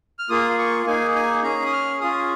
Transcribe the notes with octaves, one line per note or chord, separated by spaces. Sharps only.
F6
A#3 F4 G#4 D#6
C#6
A#3 D#4 G#4 G#5
G#5
C#4 G#4 A#5
D#6
F6
C#4 F4 G#4 D#6